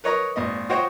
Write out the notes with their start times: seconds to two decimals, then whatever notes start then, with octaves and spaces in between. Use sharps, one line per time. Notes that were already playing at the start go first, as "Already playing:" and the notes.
0.04 A#4 B4 C#5 D#5 A#5
0.36 G#1 A#2 D#5
0.69 F4 F#4 C5 C#5 D#5 G5